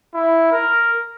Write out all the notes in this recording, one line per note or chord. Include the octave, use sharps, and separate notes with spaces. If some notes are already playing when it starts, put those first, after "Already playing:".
E4
A#4